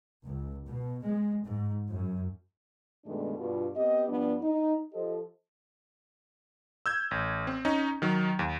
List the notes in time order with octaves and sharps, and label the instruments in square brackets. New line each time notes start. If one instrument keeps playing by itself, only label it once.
[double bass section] C#2
B2
G#3
G#2
F#2
[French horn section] G2 B2 D#3 G#3 A3 D4
G2 B2 F4
B3 C4 G4 D#5
G2 F3 B3 D4
D#4
F3 G4 A4 C5 D#5
[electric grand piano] E6 G6 G#6
A1
C4
C#4 D#4
D#3 F#3
D#2